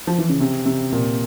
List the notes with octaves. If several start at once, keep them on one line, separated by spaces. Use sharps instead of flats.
F3
E3
C#3
C3
C3
A#2